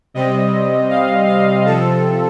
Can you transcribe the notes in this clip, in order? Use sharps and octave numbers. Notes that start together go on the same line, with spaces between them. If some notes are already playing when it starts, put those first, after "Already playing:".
C3 G3 C4 D#5
F5
F5
C3 F3 C4 A4